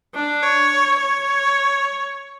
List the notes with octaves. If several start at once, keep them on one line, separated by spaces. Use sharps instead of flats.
D4
C#5
C#5